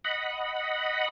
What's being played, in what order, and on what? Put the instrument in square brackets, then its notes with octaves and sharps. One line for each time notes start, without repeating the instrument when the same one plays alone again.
[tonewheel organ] D#5 F#5 B5